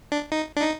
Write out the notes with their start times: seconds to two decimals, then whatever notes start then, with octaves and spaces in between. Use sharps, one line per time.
0.12 D4
0.32 D#4
0.57 D4
0.62 D#4